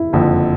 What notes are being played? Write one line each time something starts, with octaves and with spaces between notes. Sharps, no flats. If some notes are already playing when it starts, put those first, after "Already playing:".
Already playing: E4
F#1 F2 D3